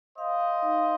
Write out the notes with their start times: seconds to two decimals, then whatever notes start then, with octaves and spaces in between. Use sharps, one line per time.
0.18 C5 D#5 F5
0.40 F5
0.62 D#4